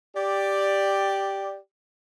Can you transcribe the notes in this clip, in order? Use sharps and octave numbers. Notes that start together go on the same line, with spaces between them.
G4 D5